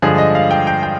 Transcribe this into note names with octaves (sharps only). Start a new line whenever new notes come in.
G2 D3 F3 G#3 G#4
D#5
F5
G5
G5
G5